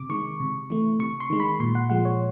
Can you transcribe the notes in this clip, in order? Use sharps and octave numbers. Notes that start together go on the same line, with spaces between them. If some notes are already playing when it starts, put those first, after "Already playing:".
Already playing: C3 D6
D#3 G#3 C#6
C3
E3 A3
C3 C#6
C6
D#3 G#3
B5
A#2 C6
F#5
F3 G#3 F#5
C#5